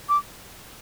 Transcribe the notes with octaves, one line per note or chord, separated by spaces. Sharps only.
D6